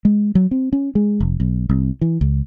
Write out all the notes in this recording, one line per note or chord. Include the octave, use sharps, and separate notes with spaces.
G#3
F#3
C4
C#4
G#3
F1
B1
C2
E3
C#2